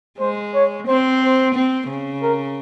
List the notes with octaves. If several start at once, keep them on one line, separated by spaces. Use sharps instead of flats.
G#3 C5
C#5
C4 C5
C5
C4
C#3
A#4